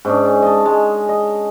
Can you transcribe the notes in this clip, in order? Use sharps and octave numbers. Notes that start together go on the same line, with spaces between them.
G#2 C#4 D4
D#5 A5
G#3
D#5